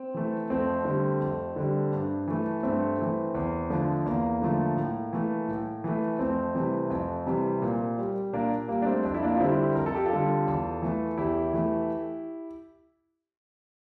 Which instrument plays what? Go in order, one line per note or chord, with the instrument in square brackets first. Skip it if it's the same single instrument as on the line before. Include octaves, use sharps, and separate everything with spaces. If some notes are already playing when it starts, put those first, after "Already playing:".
Already playing: [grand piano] C4
E3 A3
F2 A3 C4
D3 G3
F2
D3 G3
G2
E3 A3
G2 A3 C4
E3 A3
E2
D3 F3 A3
E2 A#3
D3 F3 A3
A2
E3 A3
A2
E3 A3
F2 A3 C4
C3 E3 G3
F2
C3 E3 G3
A#2
G3
A#2 A#3 D4
G3 A#3
D4
A3 C4
F2 D4
E4
A#3 D4
F4
D3 G3 C4 E4
F2 A#4
A4
G4
F4 A4
D3 G3
E2
E3 A3
E2 E4 G4
E3 A3